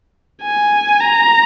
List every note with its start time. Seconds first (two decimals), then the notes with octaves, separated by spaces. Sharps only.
0.43 G#5
1.00 A#5